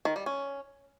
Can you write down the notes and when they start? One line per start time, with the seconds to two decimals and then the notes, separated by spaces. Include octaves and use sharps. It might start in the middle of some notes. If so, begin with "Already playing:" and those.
0.05 D#3
0.16 G3
0.26 C#4